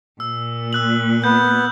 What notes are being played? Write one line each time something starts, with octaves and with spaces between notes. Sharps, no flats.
A#2 E6
E6 F#6 F#7
B3 G6